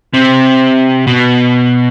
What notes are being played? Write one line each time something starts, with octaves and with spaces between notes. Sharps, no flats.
C3
B2